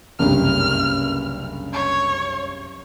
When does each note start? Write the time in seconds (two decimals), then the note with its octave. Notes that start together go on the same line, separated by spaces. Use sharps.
0.19 F#1 C2 G2 F6
1.73 C#5